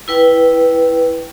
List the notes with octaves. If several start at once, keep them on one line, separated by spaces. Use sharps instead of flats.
E4 B4 G5